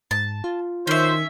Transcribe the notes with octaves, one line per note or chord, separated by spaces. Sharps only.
G#2 A5
F4
D#3 C#4 C5 E5